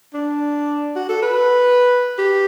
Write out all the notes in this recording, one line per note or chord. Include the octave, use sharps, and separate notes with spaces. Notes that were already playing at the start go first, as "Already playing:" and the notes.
D4
F#4
A4
B4
G4